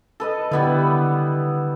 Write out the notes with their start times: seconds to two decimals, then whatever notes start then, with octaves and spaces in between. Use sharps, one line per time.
0.20 A4 B4 D#5
0.51 D3 G3 B3 E4